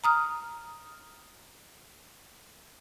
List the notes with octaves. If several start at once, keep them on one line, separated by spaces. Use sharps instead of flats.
A#5 D#6 F6